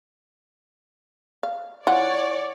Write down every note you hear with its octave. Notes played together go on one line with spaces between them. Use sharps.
F5
E3 F4 C#5 D5 F#5